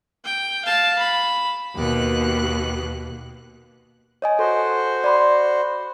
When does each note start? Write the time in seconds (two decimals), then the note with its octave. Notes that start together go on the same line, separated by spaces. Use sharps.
0.25 G5
0.65 F5 A5
0.99 B5
1.76 D#2 B2 F#6
4.22 C#5 D#5 G#5
4.39 F#4 A4 C5
5.04 D5 B5 C6